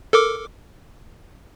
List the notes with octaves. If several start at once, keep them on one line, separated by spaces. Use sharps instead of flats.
A4 A#4 D6